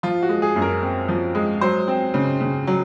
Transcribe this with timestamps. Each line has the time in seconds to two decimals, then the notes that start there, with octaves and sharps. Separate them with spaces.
0.03 F3 F4
0.22 F#4
0.29 G#3
0.42 G#4
0.56 F#2
0.62 A#4
0.82 C4
1.08 F3
1.35 G#3
1.61 F#3 C5
1.88 C4
2.14 C#3
2.41 C#3
2.67 F#3